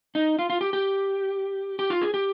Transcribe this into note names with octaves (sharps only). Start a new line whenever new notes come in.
D#4
F4
F4
G4
G4
G4
F4
G#4
G4